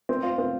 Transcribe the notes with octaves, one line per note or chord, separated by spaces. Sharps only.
C4
F4
C4